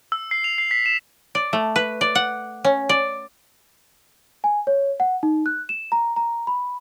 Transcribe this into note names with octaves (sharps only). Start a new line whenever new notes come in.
E6
C7
F7
C7
B6
E7
D5
A3
B4
D5
F#5
C#4
D5
G#5
C#5
F#5
D#4
F#6
E7
A#5
A#5
B5